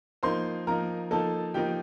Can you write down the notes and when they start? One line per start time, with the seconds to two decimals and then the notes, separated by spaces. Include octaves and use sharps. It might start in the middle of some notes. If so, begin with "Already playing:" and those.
0.23 F3 A#3 D#4 C5 C6
0.67 F3 A#3 D#4 A#4 A#5
1.11 F3 A#3 D#4 A4 A5
1.54 F3 A#3 D#4 G4 G5